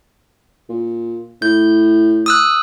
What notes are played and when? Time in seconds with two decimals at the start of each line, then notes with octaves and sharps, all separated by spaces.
0.69 A#2
1.42 A2 G6
2.26 D#6 E6 F#6